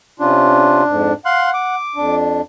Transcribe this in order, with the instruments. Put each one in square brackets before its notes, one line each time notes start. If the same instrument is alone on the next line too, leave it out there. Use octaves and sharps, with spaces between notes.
[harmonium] C3 C#4 F4 [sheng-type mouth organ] D4
[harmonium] F2 G#2
[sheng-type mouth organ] F5 C6 F#6 [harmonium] F#5
[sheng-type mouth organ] D6
[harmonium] F2 D4